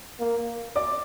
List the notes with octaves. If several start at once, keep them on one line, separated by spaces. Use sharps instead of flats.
A#3
D5 D6